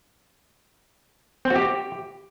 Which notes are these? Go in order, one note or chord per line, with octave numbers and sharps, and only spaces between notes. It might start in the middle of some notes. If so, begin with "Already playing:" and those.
C4
F#4
G4